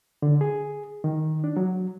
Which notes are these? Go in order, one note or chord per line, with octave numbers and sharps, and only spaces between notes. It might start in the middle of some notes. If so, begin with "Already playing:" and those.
D3
G#4
D#3
D4
F#3